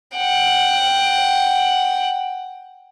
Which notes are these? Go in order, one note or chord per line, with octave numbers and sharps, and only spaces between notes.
F#5 G5